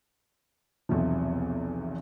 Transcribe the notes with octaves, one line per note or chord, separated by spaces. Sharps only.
B1 E2 C3 F3